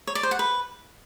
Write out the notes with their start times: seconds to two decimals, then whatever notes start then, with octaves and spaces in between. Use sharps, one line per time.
0.07 C#5
0.15 D5
0.23 C5
0.31 F#5
0.39 B4